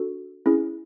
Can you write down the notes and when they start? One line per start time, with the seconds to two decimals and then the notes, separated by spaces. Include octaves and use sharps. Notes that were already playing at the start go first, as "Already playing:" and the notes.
Already playing: D4 F#4 A4
0.46 C#4 E4 G#4